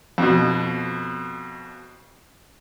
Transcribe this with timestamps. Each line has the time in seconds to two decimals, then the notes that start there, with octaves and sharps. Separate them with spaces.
0.18 F2 B2